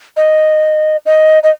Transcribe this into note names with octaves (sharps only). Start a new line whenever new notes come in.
D#5
D#5
D#5